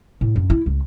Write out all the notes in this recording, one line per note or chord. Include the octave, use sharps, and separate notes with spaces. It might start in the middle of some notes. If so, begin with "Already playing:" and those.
A2
F#2
E4
C#2